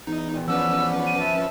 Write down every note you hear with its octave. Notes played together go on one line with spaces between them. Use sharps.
E2 D#4
A#2 D#3
F3 C#4 B4 D5 F#5 E6
D#7
E5 A5